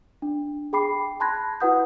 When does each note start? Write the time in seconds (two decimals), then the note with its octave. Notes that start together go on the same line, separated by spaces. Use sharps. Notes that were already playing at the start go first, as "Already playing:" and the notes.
0.22 D4
0.73 G#4 G5 B5 D6 C7
1.20 A5 B5 C6 F#6 G#6 A#6
1.60 E4 F#4 B4 F#5 D#6 G6